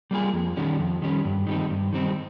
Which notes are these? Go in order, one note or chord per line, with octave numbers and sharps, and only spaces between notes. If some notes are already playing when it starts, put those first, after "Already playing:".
G3 A#3 F4 G#4
F2
D#3 G3 C#4
F2
D#3 G3 C#4
G2
D#3 G3 C4 D#4
G2
D#3 G3 C4 D#4